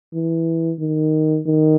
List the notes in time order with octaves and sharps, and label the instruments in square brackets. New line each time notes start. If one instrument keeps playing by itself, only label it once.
[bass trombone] E3
D#3
D#3